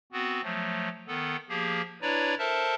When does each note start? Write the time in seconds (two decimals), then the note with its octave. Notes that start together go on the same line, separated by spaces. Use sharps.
0.12 B3 C4 F#4
0.43 F3 F#3 A3
1.07 D#3 B3 A4
1.49 F3 A#3 G4 G#4
2.02 D4 E4 B4 C#5 D5 A#5
2.39 A4 A#4 C5 E5 A5